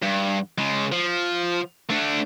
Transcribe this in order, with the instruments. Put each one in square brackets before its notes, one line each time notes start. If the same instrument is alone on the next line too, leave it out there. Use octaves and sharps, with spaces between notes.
[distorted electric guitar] G2
C#3 G#3
F3
A3 D4